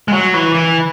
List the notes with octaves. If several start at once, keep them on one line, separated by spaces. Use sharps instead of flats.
G#3
F#3
E3
E3